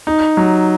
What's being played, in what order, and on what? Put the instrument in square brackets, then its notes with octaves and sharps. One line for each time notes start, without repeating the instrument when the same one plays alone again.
[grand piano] D#4
F#3